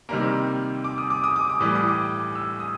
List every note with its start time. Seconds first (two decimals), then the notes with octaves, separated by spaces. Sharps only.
0.09 C3 D#3 G3 A#3 A#5
0.84 D6
0.98 D#6
1.10 D6
1.24 D#6
1.36 D6
1.50 D#6
1.60 A2 E3 G3 D6
1.75 D#6
1.89 D6
2.35 E6
2.60 D#6